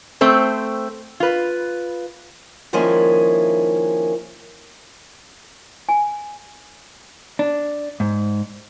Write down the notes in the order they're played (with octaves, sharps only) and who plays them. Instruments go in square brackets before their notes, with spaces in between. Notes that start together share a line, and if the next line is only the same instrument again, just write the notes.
[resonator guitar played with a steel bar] A3 C4 C5
F4 B4
[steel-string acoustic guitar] D#3 F3 G#3 A#3 C#4 E4
[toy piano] G#5
[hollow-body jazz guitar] D4
G#2